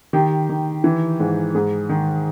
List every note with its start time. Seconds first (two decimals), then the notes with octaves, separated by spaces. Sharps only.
0.13 D#3 G4
0.49 D#3
0.84 E3
1.20 G#2
1.55 G#2 G#4
1.89 D#3